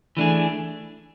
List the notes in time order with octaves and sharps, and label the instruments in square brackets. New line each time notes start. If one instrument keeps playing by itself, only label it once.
[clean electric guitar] E3 A3 D4 G#4